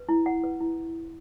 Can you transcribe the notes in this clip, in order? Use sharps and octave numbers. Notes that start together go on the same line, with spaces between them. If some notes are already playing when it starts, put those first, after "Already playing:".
Already playing: B4
E4
F#5
B4
E4